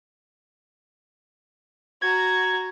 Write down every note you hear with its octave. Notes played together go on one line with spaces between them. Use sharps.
F#4 A#5 G#6